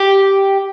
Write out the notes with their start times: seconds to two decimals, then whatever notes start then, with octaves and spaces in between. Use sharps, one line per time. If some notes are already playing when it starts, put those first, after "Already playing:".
Already playing: G4